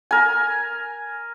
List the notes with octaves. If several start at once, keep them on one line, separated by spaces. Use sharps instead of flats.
A#4 G#5